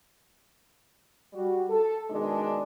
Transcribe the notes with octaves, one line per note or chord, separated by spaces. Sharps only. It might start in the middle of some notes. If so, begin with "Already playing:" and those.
G3 F#4
A4
B2 D#3 G#3 D4